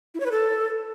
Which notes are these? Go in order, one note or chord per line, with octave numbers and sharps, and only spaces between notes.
E4
C#5
B4
A4